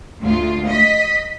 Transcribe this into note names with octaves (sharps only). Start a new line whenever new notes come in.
D2 F4
D#5 B6